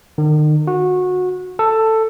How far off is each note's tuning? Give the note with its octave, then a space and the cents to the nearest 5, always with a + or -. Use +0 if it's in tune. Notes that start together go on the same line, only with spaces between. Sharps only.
D#3 -40
F#4 -20
A4 +10